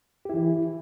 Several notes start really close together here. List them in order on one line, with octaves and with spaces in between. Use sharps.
G4 E4 E3